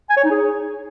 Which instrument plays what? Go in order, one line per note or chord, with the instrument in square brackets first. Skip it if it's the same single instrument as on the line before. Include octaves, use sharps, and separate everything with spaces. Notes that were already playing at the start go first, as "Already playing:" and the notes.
[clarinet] G#5
C#5
D#4
G#4